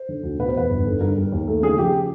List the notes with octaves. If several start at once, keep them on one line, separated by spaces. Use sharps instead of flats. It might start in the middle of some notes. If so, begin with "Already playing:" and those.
Already playing: C5
D3
D2
B2 B4
C5
E2 B4
G1
D3
G2 A#4
G3
D#2
A3
C#3 G#4
F3 G4